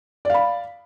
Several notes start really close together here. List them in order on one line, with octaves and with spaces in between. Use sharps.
D5 F5 B5